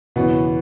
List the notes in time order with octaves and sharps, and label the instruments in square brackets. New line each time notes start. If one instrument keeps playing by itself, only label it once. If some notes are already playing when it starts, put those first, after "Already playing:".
[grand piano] F#1 E2 E3 C#4 [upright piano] B2 B3